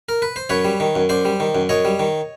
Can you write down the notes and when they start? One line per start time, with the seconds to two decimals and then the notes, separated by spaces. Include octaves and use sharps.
0.09 A#4
0.22 B4
0.36 C5
0.49 F#2 B4 C#5
0.65 G3
0.80 D#3
0.95 F#2
1.09 F#2 C5 D5
1.25 G3
1.40 D#3
1.55 F#2
1.69 F#2 C#5 D#5
1.85 G3
1.99 D#3